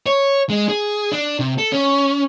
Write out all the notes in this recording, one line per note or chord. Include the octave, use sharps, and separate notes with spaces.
C#5
G#3
G#4
D4
C3
A4
C#4